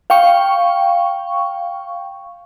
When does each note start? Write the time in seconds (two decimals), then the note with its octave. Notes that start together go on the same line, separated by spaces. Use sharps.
0.10 F5 G5 C#6